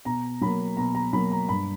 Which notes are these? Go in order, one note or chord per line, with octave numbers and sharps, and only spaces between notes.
B2 A#5
F#3 A#3 B5
B2 A#5
A#5
F#3 A#3 B5
A#5
G2 B5